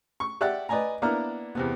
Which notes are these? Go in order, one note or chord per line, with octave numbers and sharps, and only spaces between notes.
C#6
G4 D5 E5 F#5 F#6
B4 D5 D#5 G#5 A#5
A#3 B3 D4 E4 A#4 F6
E2 C3 B3